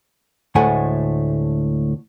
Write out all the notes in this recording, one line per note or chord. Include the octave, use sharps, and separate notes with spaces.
D2 A2 G#3 A3 F#5 G#5